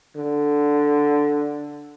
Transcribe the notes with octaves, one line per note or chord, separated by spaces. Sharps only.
D3